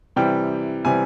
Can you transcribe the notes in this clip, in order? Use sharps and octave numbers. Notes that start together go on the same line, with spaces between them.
C3 E3 G3 G5
C3 E3 G3 G#5